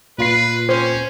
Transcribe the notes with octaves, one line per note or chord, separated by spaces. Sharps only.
A#2 F4 B4 C7
C#4 C5